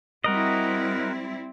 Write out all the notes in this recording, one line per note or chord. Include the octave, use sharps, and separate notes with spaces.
G3 C4 E4 F#4 A#4 D#5